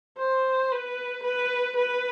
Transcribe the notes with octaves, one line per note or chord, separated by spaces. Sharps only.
C5
B4
B4
B4